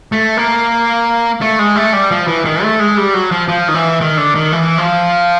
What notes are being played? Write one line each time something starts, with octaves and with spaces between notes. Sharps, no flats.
A3
A#3
A3
G#3
A3
G3
F3
E3
D#3
A3
G#3
G3
F#3
F3
F3
D#3
E3
D#3
D3
D#3
E3
F3